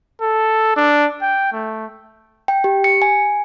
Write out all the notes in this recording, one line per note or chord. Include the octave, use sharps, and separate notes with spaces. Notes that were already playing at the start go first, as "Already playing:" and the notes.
A4
D4
G5
A3
G5
G4
C#7
G#5